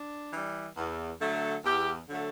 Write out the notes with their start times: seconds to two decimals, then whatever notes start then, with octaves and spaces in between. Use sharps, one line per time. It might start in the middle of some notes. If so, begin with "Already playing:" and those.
Already playing: D4
0.33 E3 G3
0.77 E2
1.20 D3 F#3 A3
1.65 E2 G4
2.08 D3 F#3 A3